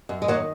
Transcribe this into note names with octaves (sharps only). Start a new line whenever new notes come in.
F#2
G#3
D#3 F#3 A#3